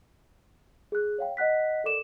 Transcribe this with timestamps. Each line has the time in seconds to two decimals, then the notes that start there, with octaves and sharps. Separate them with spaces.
0.92 G#4 F#6
1.19 C#5 F5 G5
1.37 D#5 F#5 F#6 B6
1.84 A4 A#4 D5 D6 E7